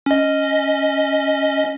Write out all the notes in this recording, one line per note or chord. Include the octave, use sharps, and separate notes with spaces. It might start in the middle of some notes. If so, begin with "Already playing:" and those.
C#4 D#5